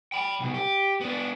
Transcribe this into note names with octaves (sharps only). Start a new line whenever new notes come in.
G5 B5
C2 B2
G4
B3 D4